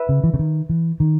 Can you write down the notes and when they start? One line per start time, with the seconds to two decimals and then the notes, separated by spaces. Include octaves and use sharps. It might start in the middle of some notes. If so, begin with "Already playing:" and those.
Already playing: B4 E5
0.09 C#3
0.24 E3
0.34 C#3
0.39 D#3
0.69 E3
1.00 D#3